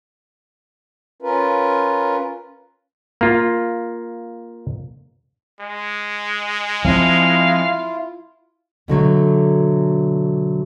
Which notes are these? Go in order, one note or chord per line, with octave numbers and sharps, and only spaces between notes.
C#4 F4 A#4 B4
A#3 F4
G#3
F3 C4 E4 F4 F5
B2 D3 F#3 A3